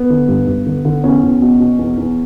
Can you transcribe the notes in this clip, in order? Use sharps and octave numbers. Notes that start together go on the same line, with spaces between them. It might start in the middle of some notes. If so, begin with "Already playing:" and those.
Already playing: B3
D3
G2
G2
D3
D3
E2 C#4
E2
B2
B2
E2
E2